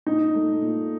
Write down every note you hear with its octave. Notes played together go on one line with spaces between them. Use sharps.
A#2 D#4
A3
A#2